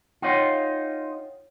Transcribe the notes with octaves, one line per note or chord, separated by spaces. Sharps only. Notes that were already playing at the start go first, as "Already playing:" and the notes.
D#4 F4 C#5 F#5 G5